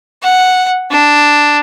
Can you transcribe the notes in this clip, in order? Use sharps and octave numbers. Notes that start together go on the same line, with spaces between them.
F#5
D4